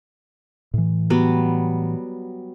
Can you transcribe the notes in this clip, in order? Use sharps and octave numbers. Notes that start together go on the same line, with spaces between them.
A2 E3
F#3 G3 B3